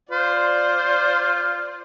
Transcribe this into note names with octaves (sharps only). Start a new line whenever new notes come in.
F4 C5 D5